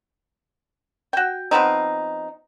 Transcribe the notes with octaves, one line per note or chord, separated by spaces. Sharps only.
F#4 G5
F3 B3 C4 D#4